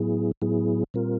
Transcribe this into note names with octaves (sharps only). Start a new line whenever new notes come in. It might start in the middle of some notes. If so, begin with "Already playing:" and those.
Already playing: A2 F#3 B3 E4 G#4
A2 F#3 B3 E4 G#4
A#2 G3 C4 F4 A#4